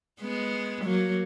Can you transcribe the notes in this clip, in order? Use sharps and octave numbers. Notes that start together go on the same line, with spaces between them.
G#3 B3
F#3 A#3